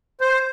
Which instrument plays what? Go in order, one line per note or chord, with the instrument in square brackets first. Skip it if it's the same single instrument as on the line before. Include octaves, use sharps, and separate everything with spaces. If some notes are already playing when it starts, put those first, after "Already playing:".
[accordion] C5